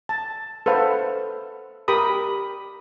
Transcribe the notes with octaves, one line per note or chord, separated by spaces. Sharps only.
A5
A4 B4 C5 F5 F#5
G4 A#4 B5 D#6